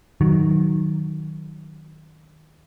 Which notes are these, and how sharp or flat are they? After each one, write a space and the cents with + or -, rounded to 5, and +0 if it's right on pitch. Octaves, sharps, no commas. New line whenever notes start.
D#3 +0 F#3 +0